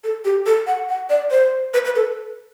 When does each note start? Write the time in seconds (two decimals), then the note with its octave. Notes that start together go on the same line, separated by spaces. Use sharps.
0.04 A4
0.25 G4
0.46 A4
0.67 F#5
0.89 F#5
1.10 D5
1.31 C5
1.74 B4
1.85 B4
1.96 A4